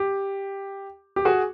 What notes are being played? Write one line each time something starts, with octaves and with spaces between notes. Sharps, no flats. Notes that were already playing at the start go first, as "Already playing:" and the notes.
Already playing: G4
G4
F#4 G#4